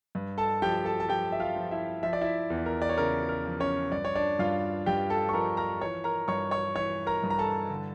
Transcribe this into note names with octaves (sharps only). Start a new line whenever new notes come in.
G2
A4 A5
F3 G4 G5
A4 A5
A5
F3 G4 G5
E5
F4 F5
F3
E4 E5
F3 E5
D5
E4 E5
E2
A#4
D5
C#5
C#3 A#4
A#4
F3
C#4 C#5
G2 D5
C#5
D4 D5
G2 F4 F5
G2 G4 G5
A4 A5
C#6
F3 A#4 A#5
A#4 A#5
E3 C#5 C#6
A#4 A#5
G2 C#5 C#6
C#5 C#6
E3 C#5 C#6
A#4 A#5
G2
A#5
A4 A5
D3